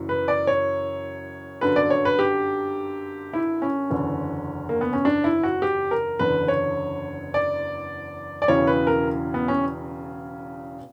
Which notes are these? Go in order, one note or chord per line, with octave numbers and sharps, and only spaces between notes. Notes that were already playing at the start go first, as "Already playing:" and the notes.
Already playing: F#1 F#2 E3
B4
D5
C#5
G1 F#2 D3 B4
D5
C#5
B4
G4
E4
C#4
F#1 E2 D3
A#3
B3
C#4
D4
E4
F#4
G4
A#4
F#1 E2 D3 B4
C#5
D5
D5
E1 E2 C#3 E3 C#5
B4
A#4
B3
C#4